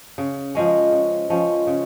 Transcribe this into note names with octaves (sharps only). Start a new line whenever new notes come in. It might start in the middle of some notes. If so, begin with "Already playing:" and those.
C#3
F3 G#3 C#4
C#3
F3 G#3 C#4
C#3